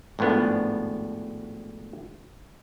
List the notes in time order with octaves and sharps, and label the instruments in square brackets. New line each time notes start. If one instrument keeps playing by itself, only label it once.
[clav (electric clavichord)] G#1 A2 F3 B3 D4